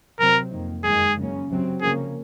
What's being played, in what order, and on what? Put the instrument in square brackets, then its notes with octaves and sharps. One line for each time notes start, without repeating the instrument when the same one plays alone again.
[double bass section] C3 F#3 C4 [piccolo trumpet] A#4
[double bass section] F2 D#3 A#3
[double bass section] F#2 D#3 G#3 [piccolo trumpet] G#4
[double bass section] C#3 F#3 A#3 C#4
C3 F#3 C4
[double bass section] C#3 F3 A#3 C#4 [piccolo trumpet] G#4